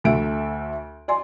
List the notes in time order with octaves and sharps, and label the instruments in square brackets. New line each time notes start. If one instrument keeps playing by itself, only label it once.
[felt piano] D2 A3 E5 D7
D5 G#5 C6